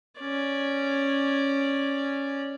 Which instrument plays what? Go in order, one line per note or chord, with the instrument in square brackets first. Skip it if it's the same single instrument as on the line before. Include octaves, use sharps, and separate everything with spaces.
[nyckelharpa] C#4 D5